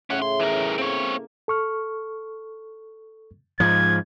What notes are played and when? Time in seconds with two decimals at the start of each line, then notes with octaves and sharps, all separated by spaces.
0.10 A2 C#3 C#4 E4 F#5
0.22 C6
0.40 E3 A#4
0.78 A#3 C4 C#5
1.48 A4 C#6 F6
3.60 G#2 F3 G#6